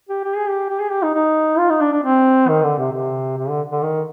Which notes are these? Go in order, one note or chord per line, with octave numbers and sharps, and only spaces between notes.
G4
G4
G#4
G4
G4
G#4
G4
D#4
D#4
F4
D#4
D4
D4
C4
D#3
D3
C3
C3
C3
D3
D3
D#3